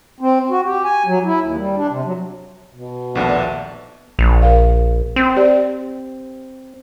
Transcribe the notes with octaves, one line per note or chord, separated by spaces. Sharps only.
C4
F#4
G4
G#5
F#3
E4
D#2
G3
D4
C3
F#3
B2
A#1 D#2 A3 B3 D4
A#1
A#4 F5
C4
G4 D5